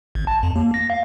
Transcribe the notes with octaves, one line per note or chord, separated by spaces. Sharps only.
G#1
A5
F2
A#3
A#6
F5